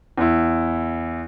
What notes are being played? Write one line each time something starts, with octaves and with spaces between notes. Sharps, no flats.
E2 E4